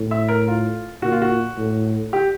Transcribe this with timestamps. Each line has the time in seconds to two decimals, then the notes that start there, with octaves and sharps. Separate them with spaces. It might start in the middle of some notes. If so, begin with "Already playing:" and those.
Already playing: A2
0.11 E5
0.28 A#4
0.48 F4
1.02 A#2 F#4
1.12 F4
1.22 F#4
1.58 A2
2.13 G4